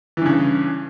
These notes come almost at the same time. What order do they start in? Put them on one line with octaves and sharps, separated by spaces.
E3 G2 C#3